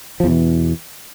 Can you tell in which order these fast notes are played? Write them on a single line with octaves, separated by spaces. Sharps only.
F3 E2 B2 E3